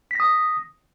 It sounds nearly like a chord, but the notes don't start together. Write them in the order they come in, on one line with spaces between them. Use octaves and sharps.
B6 A#6 D#6